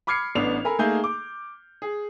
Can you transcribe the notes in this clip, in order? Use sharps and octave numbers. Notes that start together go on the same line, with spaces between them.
B5 D6 F6 G#6 C7 C#7
A1 B3 D4 F7
A4 A#4 G#5 B5
A3 A#3 D#4 G#4 G#5 G6
D6
G#4